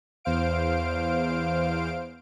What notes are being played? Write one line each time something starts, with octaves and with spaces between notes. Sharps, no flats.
E2 C5 F5 D7